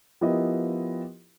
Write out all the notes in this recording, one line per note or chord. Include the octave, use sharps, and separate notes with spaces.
F3 B3 E4 G4 A#4 D#5